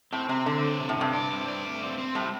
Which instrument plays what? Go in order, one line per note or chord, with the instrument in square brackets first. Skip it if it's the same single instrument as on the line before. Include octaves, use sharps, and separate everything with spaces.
[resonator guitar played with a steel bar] A2 [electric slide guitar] C4
[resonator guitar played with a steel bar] C3 [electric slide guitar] C4
[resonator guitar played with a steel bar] D3 [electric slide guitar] C4
[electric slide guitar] D4
C3
[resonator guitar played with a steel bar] A2
[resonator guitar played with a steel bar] G2 [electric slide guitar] C3
[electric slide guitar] D5
C4
D5
A3
C4
C4
[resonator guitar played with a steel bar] A2 [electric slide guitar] G3